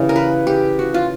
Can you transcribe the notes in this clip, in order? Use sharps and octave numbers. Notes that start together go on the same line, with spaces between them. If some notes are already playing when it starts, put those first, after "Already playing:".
Already playing: C#3 E3 G3
A#4
B4
G4
F#4
F4